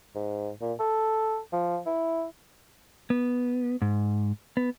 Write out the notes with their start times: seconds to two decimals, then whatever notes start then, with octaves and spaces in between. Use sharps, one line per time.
0.16 G#2
0.61 A#2
0.79 A4
1.53 F3
1.86 E4
3.10 B3
3.82 G#2
4.57 B3